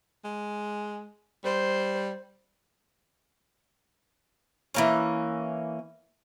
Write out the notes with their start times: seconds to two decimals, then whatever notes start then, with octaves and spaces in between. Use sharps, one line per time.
0.24 G#3
1.44 G3 C5
4.74 E3 A#3 C#4